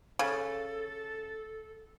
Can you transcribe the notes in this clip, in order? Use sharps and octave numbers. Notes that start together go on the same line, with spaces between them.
C#3 A4